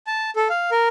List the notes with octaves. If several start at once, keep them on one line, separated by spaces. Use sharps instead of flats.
A5
A4
F5
A#4